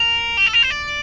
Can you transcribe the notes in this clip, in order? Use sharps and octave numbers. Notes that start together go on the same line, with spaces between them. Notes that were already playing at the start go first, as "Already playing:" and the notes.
Already playing: A#4
G4
A4
A#4
C5
D5